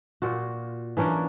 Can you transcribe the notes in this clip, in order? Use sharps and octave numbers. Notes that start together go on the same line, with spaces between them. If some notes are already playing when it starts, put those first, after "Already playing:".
A#2 F4 F#4
E3 A#3 C#4 D4